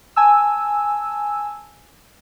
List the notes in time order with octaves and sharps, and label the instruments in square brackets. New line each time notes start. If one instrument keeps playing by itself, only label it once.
[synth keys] G#5 A5 E6